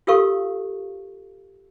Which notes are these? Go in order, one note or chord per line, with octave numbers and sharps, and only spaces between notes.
F4 G4 A4 A#4 F5 C#6